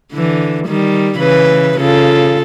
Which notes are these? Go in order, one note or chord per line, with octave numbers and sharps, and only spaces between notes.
D3 E3
D#3 G3
C#3 E3 B4
C#3 F4 A4